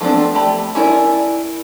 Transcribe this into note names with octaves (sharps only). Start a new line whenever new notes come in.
F3 A3 B3 C4 D4
A3 G4 B5
C#4 E4 A#4 C#5 D5